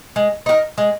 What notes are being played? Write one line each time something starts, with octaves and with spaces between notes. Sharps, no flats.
G#3
D#4 F#4 A#4
G#3